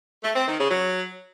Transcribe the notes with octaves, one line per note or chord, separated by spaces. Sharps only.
A3
C4
D#3
C#3
F#3